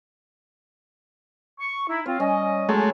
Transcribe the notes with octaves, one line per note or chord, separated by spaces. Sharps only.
C#6
D#4 E4
C4 F4 C#5
G3 C#4 D#5
F#3 G#3 A3